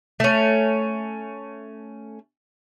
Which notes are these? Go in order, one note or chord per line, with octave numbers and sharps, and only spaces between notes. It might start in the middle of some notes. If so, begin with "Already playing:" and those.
A3 C#4